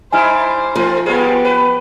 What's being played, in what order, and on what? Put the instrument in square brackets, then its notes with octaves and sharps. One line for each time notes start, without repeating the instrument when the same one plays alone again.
[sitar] G3 D#4 E4 [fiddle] C5 [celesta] G#5 F6
[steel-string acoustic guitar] F3 [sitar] A3 C4 F4
[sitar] G3 F4 G#4 [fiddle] B3 G4
[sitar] B4